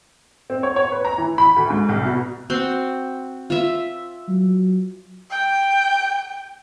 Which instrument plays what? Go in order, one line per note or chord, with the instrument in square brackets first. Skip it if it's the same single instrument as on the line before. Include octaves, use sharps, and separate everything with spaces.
[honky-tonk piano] C4
C#5
C#5
B4
A#5
E3
B5
D2
G#2
C2
B2
[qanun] C4 F#4 C6
F4 E5
[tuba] F#3
[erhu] G5